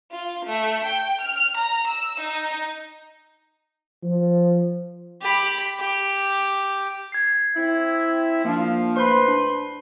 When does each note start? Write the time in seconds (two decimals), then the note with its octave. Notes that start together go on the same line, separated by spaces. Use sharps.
0.12 F4
0.46 A3
0.85 G5
1.21 F6
1.57 A#5
1.88 E6
2.21 D#4
4.03 F3
5.21 G4 B5
5.80 G4
7.12 G#6 C7
7.57 C4 E4 E5
8.45 F3 A#3 D4
8.97 A2 B4 C5 B5 C6
9.28 D4